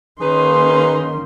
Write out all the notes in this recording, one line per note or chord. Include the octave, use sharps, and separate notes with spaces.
D#3 A#3 C#4 D#4 G#4 B4 C6